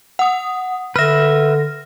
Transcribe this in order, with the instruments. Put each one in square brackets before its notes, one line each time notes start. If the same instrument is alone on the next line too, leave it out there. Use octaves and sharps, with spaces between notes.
[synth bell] F#5 D#6
[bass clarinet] D3 [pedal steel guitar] B4 E5 [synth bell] F6 A#6